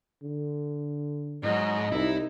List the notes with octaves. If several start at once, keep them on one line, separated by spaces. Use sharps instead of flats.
D3
G#2 F#3 D#5
C2 D#4 E4